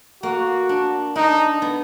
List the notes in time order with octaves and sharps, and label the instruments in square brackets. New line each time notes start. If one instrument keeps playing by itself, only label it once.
[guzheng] A#3 [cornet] F#4
[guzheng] D4
[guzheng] D4 [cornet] D#4
[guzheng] B3